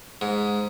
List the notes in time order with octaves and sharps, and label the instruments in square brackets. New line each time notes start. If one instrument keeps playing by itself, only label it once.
[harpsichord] G#2